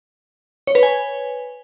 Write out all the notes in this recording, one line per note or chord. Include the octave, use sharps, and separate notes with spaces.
C#5
B4
G#5